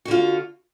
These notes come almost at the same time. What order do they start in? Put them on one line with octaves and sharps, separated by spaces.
F#4 D3 F4